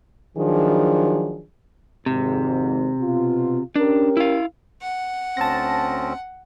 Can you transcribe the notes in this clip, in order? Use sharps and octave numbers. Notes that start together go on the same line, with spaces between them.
D#3 F3 F#3 D4 G#4
G#1 F2 G#2 C3
B2 F4
C#4 D4 G4 A#4
E4 F5
F#5
D2 C4 C#4 A5 A#6